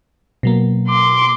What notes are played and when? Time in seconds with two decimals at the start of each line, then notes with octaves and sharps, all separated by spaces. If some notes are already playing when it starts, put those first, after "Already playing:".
0.43 B2 F#3 A#3
0.88 C6 D6